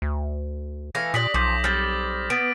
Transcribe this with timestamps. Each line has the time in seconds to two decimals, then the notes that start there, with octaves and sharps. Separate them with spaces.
0.02 D2
0.95 E3 A3 F5 A#6
1.14 A#2 D4 G4 D5 D#6 B6 F#7
1.34 B1 F3 D6 G6 B6
1.64 G3 C4 F6 A6
2.30 B3 D7